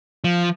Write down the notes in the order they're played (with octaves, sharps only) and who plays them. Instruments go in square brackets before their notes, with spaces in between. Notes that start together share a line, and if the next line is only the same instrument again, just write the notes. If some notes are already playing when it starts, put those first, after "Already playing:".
[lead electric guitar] F3